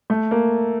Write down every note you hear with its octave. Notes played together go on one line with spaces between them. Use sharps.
A3
A#3